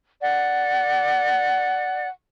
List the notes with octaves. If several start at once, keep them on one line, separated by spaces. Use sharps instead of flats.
D5 F#5